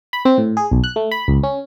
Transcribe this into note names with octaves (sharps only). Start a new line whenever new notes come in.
B5
C4
A2
G#4
B1
F#6
A3
B5
C#2
C#4